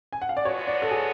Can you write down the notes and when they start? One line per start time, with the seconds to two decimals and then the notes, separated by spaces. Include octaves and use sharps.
0.13 G#5
0.22 F#5
0.29 F5
0.37 D5
0.45 F#2 F3 G#3 B3 F#4 C#5
0.68 D5
0.82 A4
0.91 G#4